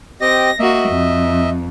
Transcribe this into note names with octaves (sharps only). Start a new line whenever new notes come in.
C4 G4 D#5 A#6
A#3 F#4 D#5 E5
F2